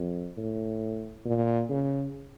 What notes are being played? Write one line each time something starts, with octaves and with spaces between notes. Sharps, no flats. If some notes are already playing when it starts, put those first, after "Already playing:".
Already playing: F2
A2
A#2
C#3